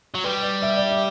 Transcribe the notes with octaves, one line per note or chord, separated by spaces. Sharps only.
F#3
G3 B4
D5
E5
D5
E5